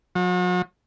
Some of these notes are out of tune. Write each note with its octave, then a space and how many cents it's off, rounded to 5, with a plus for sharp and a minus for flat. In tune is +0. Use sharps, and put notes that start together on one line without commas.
F#3 -40